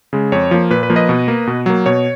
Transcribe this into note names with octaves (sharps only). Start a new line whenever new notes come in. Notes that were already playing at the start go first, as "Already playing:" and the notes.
C#3 G#3
F2 C#5
F3 A#3
A#2 B4
B4
F3 A#3
B4 D#5
B2
A#3
B2
F#3 A#3
B2 C#5